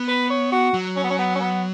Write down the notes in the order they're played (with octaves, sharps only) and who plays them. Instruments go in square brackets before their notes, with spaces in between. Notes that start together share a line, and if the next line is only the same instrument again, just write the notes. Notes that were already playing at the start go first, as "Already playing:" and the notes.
Already playing: [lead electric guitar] B3
[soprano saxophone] B4
C#5
F#4
[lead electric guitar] F#3
[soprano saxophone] C#4
B3
C#4
B3
C#4
B3